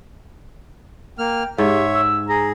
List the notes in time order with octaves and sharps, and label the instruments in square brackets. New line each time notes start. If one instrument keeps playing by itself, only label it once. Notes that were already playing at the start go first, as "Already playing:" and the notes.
[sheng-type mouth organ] A#3 F6 [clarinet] G5
[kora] G#2 [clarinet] G4 [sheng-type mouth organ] C#5 E5
[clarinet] E6
[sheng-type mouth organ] G#4 [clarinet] A#5